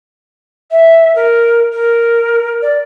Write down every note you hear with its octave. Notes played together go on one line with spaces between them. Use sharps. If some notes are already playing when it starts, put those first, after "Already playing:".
E5
A#4
A#4
D5